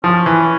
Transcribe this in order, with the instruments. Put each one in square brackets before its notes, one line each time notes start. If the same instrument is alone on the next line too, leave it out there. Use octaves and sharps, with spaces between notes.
[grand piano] F3 [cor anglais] C#4
[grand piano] E3